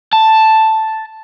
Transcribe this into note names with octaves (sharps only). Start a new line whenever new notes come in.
A5